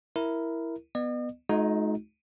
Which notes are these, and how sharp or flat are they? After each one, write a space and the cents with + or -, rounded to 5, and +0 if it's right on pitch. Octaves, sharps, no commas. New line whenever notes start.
E4 +0 A#4 +0
B3 +0 D#5 -45
G#3 +45 D#4 +0 F#4 -45